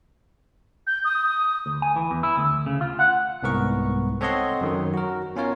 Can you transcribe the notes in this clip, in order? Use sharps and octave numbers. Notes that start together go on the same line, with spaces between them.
G6
D#6
D2
G#5
E3
E2
E4
D2
C#3
F4
F#5
C2 G#2 B3 A#4 C#6
C4 A4 C#5 D#5 F#5 C6
F#2 D#3 F#3
F#4 A#4
B3 C#4 D#4 F4 A#4 C#5